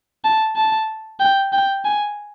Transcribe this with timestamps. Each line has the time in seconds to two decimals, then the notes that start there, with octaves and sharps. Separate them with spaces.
0.25 A5
0.56 A5
1.20 G5
1.53 G5
1.85 G#5